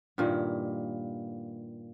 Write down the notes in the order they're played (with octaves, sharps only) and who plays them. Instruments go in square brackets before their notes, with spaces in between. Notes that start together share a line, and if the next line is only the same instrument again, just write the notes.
[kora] G2 A#2 D#3 E4